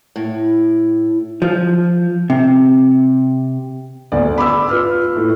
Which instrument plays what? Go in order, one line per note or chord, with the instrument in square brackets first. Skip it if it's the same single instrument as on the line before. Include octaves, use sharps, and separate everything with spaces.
[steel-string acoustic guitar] A2
[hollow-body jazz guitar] F3
C3
[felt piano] G1 D2 D5
B5 D6 E6
F4 B4 F6
A2